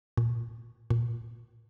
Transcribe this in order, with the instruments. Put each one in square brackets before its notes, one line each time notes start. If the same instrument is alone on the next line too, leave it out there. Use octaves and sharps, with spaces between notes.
[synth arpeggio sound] A#2
A#2